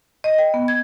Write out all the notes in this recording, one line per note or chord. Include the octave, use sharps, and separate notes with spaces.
D#5
G5
B3
G#6